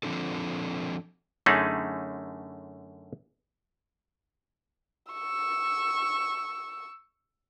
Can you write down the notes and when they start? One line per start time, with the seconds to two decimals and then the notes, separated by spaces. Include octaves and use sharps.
0.03 F3 C4 D4 A4
1.46 F#2 D3 A3 C#4 D#4 G#4
5.12 C#6 E6